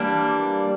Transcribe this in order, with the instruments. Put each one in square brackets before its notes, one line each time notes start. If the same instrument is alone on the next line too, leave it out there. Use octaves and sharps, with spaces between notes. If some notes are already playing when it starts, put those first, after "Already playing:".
Already playing: [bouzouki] E3 G3 A#3 D4